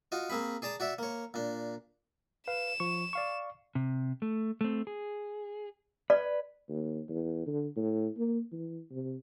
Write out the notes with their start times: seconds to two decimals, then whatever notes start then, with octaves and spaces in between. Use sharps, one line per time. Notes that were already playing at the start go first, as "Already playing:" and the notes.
0.12 F4 F#4 D#5
0.30 A#3 C4 G#4 B5
0.62 G#4 D5 A5 A#5
0.80 F#4 D5 E5
0.98 A#3 C#5
1.34 A#2 D4
2.48 B4 F5 E7
2.80 F3 C#6
3.13 D5 F5 C#6
3.75 C3
4.22 A3
4.61 A3 C4
4.87 G#4
6.10 B4 D5
6.68 D#2
7.09 E2
7.46 D3
7.76 A2
8.17 A#3
8.52 E3
8.91 C3